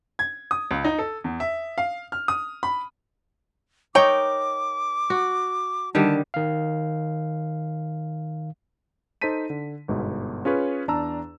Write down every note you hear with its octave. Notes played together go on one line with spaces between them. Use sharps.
G#6
D#6
C#2
D#4
A4
E2
E5
F5
F6
D#6
B5
D#4 A#4 C#5 G5 D6
F#4
D3 D#3 G3 A5
D#3 F5
D#4 A4 C5 A5 B6 D#7
D3
G1 G#2 B2
C#4 F4 G#4 B4 C#5
E2 D4 A5 A#5 E6